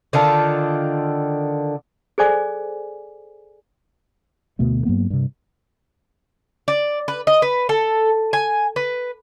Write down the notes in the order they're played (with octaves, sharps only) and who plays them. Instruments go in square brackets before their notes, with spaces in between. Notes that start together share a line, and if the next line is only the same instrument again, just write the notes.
[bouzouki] D3 D#3 F4 A5
[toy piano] G#4 A4 C5 D5 G#5 D6
[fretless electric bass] D2 B2 A3 B3
G2 F#3 A#3 B3
G2 C3
[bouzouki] D5
B4
D#5
B4
A4
G#5
B4